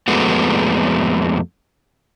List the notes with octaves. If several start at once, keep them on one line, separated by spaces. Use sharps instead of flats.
F2 G#3 A3 B3 F#4